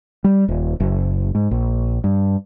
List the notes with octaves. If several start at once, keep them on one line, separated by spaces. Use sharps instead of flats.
G3
D#1
F#1
G#2
A#1
G2